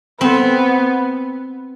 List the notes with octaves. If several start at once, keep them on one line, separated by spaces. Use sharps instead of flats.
B3 C4